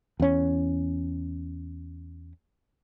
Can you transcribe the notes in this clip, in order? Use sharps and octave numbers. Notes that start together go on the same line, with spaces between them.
E2 C#4